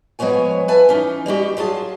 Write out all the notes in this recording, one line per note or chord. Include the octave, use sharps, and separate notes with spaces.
F3 G#3 B3 C#5 G#5
B4 E5 G#5 A5
E3 C#4 D#4
G3 G#3 F#4 G4
F#3 F4 G#4 A5